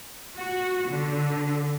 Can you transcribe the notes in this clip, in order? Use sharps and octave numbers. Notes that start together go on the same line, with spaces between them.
F#4
D3